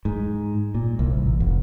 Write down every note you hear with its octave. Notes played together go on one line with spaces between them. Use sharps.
G#2
A#2
C2
A1
F1